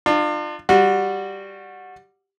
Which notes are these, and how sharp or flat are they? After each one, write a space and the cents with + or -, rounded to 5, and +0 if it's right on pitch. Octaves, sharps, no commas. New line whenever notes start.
D4 +40 F4 +0
G3 +0 F#4 -15